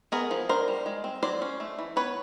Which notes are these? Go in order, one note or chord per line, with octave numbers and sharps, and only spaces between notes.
B3 G#4 A#4
F3
D4 A#4 C5
G3
G#3
C4
F#3 C5 D5
C#4
A3
E3
B3 B4 C#5